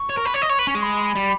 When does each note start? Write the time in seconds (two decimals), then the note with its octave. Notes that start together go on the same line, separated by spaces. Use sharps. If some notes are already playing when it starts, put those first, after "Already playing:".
Already playing: C#6
0.10 C#5
0.18 A#4
0.25 B4
0.34 C#5
0.42 D#5
0.50 C#5 C#6
0.59 B4
0.66 C#4 C#6
0.75 G#3
0.83 B5
1.15 G3